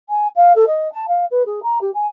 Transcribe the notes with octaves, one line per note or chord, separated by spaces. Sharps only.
G#5
F5
A4
D#5
A5
F5
B4
G#4
A#5
G4
G#5